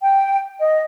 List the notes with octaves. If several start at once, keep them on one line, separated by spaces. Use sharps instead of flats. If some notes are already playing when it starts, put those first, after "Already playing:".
G5
D#5